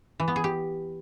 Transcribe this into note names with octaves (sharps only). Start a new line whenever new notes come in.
E3
B3
G#4
G4